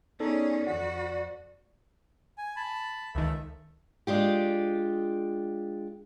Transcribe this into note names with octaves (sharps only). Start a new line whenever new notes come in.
B3 C#4 D#4 G#4 A4 D5
F2 F#4 F#5
G#5
A5 B5
C#2 D#3 A4 E5
G#3 D4 F4 G4